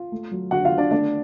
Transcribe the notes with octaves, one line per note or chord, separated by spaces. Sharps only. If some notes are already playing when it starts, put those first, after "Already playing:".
Already playing: F4
A3
F#3
D3 F#4 F#5
F4 F5
D3
D4 D5
A3 D4 D5